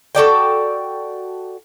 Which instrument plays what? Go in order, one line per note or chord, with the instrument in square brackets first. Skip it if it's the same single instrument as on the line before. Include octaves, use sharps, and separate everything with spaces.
[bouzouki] F#4 A4 D5 G5